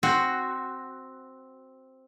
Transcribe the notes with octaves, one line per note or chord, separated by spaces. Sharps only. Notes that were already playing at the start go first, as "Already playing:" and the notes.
C4 F#4